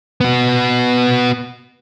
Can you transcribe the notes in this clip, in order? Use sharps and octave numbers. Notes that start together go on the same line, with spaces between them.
B3 F#4